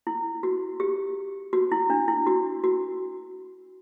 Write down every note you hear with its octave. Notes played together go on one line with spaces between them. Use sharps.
E4
F#4
G4
F#4
E4
D4
E4
F#4
F#4